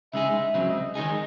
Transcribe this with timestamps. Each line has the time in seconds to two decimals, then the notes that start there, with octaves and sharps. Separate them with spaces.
0.13 C#3 G#3 D#4 G#4 E5
0.54 C#2 C#3 F#3 C4
0.69 D#5
0.81 D#5
0.95 D#3 G#3 D#4 G#4